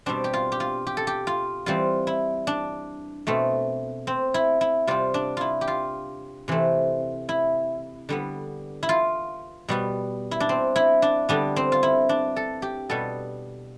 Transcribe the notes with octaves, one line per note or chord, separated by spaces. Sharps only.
B2 G3 C4 D4
G4
F4
G4
F4
G4
A4
G4
F4
E3 G3 C4 F4
E4
D4
B2 A3 C4
C4
E4
E4
C3 G3 C4 F4
D4
E4 F4
G4
F4
C3 E3 A3 C4
E4
D3 G3 B3
E4
F4
B2 G3 B3
E4
D4
C4
E4
D4
D3 G3 B3 D4
C4
F4
E4
D4
A4
G4
B2 G3 B3 A4